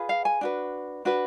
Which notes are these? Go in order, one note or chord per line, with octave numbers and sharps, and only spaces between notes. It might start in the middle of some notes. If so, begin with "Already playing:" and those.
Already playing: F4 G#4 B4
F5
G#5
D4 F#4 B4
D4 F#4 B4